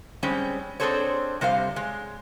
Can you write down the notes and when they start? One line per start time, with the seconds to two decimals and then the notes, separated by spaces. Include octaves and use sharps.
0.23 G3 G#3 C4 C#4
0.80 C4 D4 G#4 A4 C5 C#5
1.41 C3 G3 C5 F5
1.76 G#3